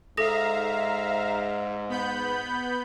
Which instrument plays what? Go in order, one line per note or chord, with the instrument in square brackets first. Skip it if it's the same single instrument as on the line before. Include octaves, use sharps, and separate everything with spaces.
[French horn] G#2 [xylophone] A4 D#6 A#6 [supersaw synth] E5 F5 A#5
[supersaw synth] B3 B5 G6